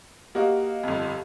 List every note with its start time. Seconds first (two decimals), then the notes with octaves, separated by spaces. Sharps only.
0.35 A#3 F#4 G4 D#5 F5
0.84 G1 F2